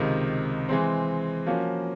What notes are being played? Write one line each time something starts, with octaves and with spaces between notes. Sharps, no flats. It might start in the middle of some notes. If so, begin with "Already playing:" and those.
Already playing: C#2 C3 D#3
E3 G#3 C4
F3 A#3 C#4 F#4